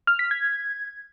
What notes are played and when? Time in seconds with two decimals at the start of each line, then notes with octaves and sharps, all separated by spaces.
0.07 F6
0.19 B6
0.31 G#6